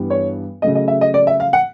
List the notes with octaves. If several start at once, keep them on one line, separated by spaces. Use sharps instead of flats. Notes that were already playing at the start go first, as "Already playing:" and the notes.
Already playing: G2 E3 G3 B3
C#5
C#3 F#3 A3 D#5
D#5
E5
D#5
D5
E5
F5
F#5